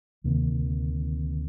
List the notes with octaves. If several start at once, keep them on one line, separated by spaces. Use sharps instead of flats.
D2 C3 D#3 A#3